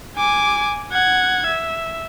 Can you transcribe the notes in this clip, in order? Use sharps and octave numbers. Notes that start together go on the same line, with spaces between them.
G#5 D6
F#5 G#6
E5